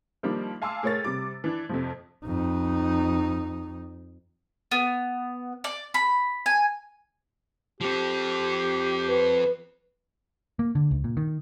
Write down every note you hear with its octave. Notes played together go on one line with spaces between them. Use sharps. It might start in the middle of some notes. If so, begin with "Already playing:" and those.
D#3 F3 G3 A#3 D4
F5 G#5 A5 C6 D6 E6
A2 G#4 A#4 C#5 C#6 A6
C3 G3 D6
E3 D4
F2 C3 F3
F2 D#4
B3
D5
B5
G#5
F3 C4 G4
B4
A#3
D3
C#2
A#2
D#3